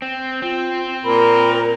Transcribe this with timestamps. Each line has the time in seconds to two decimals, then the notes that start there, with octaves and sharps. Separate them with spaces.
0.02 C4
0.42 C4 F4
1.04 A#2 A#4 B5